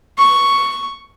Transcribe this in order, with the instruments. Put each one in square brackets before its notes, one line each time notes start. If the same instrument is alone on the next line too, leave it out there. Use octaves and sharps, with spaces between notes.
[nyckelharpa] C#6